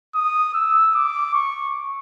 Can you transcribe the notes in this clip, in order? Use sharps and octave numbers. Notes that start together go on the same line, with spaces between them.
D#6
E6
D6
C#6